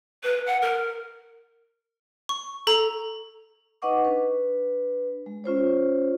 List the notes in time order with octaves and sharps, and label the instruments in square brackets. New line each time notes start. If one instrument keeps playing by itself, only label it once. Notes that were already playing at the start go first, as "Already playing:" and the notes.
[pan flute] B4
F#5
A#4
[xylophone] C#6
A4 A#5
[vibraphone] D#4 B4 D#5 F#5 C#6 D6
D4 B4
G#3
C#4 F4 C5 C#5